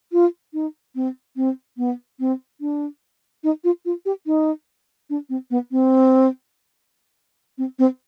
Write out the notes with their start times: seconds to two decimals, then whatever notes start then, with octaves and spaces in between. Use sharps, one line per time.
0.12 F4
0.54 D#4
0.95 C4
1.36 C4
1.78 B3
2.20 C4
2.61 D4
3.44 D#4
3.64 F4
3.85 F4
4.06 G4
4.26 D#4
5.10 D4
5.29 C4
5.51 B3
5.71 C4
7.58 C4
7.79 C4